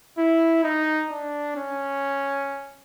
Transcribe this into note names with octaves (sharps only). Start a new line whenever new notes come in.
E4
D#4
D4
C#4